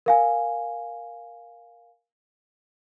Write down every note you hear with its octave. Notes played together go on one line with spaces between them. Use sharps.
A#4 F5 G#5